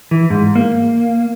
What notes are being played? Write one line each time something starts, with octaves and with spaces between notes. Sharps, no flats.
E3
G#2
A#3